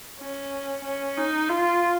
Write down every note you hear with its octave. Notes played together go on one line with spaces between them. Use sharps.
C#4
C#4
D#4
F4